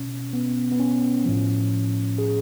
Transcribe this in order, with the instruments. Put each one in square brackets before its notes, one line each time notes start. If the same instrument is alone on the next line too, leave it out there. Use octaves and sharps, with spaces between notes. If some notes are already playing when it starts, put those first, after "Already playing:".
Already playing: [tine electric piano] B2 C#4
B3
B3
C#4
A2 F3
G#4